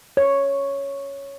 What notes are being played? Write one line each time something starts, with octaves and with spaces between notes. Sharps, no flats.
C#5